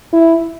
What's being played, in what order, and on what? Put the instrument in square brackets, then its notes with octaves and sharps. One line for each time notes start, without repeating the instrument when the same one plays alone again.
[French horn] E4